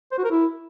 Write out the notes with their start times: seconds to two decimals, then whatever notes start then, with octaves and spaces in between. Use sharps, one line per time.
0.12 C5
0.18 F#4
0.25 A#4
0.31 E4